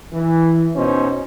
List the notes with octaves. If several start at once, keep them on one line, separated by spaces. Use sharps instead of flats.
E3
B2 C#4 D#4 C5